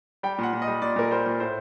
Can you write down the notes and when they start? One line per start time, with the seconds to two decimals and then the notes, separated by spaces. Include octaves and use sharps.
0.23 G3 G5
0.38 A#2 F#5
0.53 A#2
0.62 D#5
0.67 G3
0.82 A#2 D5
0.96 A#2 A#4
1.11 G3 C5
1.26 A#2
1.40 A2 C5